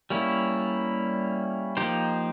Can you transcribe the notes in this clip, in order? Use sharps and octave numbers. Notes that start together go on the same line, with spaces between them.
G3 A#3 C#4 E4
F3 A#3 D#4 G4 C5